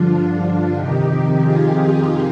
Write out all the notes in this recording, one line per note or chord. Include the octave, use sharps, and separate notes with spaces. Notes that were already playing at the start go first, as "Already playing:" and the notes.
Already playing: G2 D3 F3 D4 F4
F2 C3 D#3 D#4 G4
F4 G#4